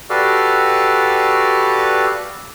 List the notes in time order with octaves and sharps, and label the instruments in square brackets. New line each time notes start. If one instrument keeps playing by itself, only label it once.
[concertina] F#4 G4 A4 B4 D5 F5